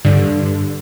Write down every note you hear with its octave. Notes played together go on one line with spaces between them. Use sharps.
G2 D3